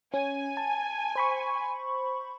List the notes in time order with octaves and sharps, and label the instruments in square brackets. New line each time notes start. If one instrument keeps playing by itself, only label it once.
[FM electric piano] C#4 [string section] G#5
[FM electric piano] A5
C5 B5 C#6